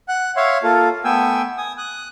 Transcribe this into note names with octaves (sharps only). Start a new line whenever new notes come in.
F#5 F#6
C#5 E5 F5 C6
A#3 F4 A4
A3 B3 G5 G#5 E6
G#5 D#6
D#6 F#6